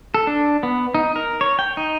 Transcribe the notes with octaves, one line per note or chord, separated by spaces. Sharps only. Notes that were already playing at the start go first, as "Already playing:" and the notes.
A4
D4
B3
D#4
A#4
C#5
G5
D#4